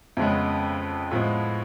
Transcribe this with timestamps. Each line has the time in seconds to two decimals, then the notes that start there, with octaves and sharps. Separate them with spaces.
0.17 F2 C#3 G#3 B3
1.11 A2 F3 G#3 B3